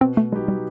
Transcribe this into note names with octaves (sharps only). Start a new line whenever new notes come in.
B2 C4
A3
F#3 G#3 B3 D#4 G4
G3